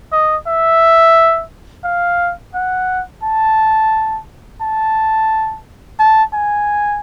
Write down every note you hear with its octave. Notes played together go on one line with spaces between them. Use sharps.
D#5
E5
F5
F#5
A5
A5
A5
G#5